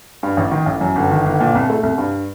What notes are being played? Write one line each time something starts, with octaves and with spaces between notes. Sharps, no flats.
G2
A1
D#3
A1
F#2
G1
D#3
G1
A#2
C2
A3
C2
G2